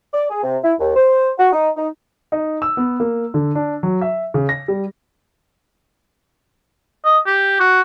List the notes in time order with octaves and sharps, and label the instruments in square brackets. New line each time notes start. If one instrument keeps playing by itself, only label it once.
[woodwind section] D5
G#4
C3
E4
D#2
C5
F#4
D#4
D#4
[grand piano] D#4
E6
B3
A#3
D3
D4
F#3
E5
C#3
A#6
G3
[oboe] D#5
G4
F#4